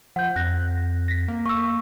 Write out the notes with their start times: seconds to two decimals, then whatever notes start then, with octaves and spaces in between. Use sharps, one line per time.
0.16 F3 F#5 G6
0.36 F2 F#6 A#6
1.08 A#6 B6
1.28 A#3
1.46 A#3 C#6 E6